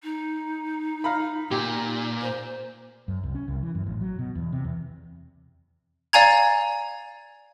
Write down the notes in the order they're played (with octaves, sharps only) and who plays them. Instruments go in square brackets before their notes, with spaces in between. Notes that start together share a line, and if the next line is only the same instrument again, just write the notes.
[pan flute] D#4
[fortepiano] F5 A#5 B5
[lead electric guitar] A#2 [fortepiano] G4
[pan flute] C5
[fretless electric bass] F#2
C2
C#4
C2
E3
F#2
A1
F#3
B2
E2
C3
E2
[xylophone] D5 F5 G#5 A#5 G#6